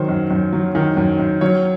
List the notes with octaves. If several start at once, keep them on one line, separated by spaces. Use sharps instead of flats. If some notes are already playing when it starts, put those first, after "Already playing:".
Already playing: D#3 F#3 C5
F#2
F#2
F#3
D#3
F#2
F#2
F#3 C#5